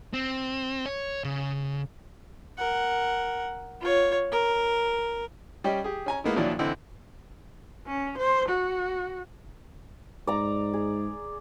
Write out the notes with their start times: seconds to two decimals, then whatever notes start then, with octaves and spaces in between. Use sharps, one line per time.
0.13 C4
0.86 C#5
1.24 C#3
2.57 A#4 F#5
3.81 F4 C#5
4.32 A#4
5.64 G3 C#4 G4 D#5 G5
5.84 G4 G#4
6.06 C#4 G#5 A#5
6.24 G#3 A#3 B3 D#4 E4
6.36 A#2 D#3 F3 F#3 D4 E4
6.59 D3 E3 C4 D#4 E4
7.87 C#4
8.18 C5
8.49 F#4
10.27 G#2 D5 A#5
10.73 G#4